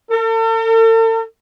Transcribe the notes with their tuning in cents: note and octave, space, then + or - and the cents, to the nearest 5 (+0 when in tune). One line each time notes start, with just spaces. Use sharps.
A4 +45